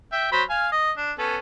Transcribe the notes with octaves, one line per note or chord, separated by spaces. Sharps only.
E5 G5
F#3 C5 B5
F5 G#5 F6
D#5
D4
B3 C#4 A4